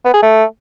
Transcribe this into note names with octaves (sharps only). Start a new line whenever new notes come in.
B3
G#4
A3